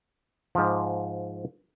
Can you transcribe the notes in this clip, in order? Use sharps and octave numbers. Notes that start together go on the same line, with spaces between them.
G#2 F3